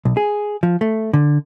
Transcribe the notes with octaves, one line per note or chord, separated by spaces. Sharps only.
B1
G#4
F3
A3
D3